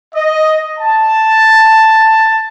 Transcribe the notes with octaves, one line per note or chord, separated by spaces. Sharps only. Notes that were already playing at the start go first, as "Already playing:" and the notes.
D#5
A5